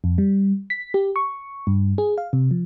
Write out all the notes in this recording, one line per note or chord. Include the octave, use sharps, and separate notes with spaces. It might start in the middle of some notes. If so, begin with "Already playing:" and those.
F2
G3
B6
G4
C#6
G2
G#4
F5
C3
F3